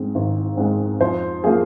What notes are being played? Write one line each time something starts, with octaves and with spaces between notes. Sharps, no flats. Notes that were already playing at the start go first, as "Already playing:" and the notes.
Already playing: G#2 G#3 C4
G#1
G#2 G#3 C4
F2 C5
F3 A#3 G#4